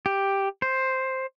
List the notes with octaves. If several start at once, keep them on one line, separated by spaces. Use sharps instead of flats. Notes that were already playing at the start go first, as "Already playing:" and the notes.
G4
C5